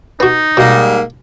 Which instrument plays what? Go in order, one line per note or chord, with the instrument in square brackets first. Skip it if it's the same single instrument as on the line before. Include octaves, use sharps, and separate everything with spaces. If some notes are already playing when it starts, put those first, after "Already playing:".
[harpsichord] B3 F#4 [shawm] D#4
[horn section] G#2 G3 A#3 [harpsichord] B2